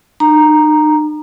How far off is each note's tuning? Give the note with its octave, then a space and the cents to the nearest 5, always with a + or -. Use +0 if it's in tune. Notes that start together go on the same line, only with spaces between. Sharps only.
D#4 -40 A#5 +0